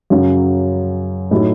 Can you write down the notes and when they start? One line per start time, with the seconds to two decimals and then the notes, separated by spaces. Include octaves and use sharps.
0.10 F#2 C#3 F#3
1.31 A2 F#3 A3 D#4 F#4